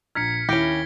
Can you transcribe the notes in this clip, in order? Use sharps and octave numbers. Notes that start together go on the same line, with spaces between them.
A#1 A#5 F6 G#6 B6 C#7
D#2 C#4 E4 G4 A#6 D7 G7